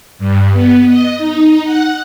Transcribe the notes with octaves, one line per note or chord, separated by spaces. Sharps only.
G2
B3
D#5
D#4
F#5